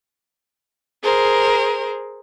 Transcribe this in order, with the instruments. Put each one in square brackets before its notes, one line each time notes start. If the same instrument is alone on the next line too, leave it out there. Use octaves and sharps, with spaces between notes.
[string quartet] G#4 A#4 C5